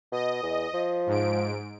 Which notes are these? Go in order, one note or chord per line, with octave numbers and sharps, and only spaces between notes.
B2 D#5
E2
F3
G#2 D7